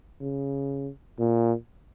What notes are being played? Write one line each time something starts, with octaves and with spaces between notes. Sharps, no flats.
C#3
A#2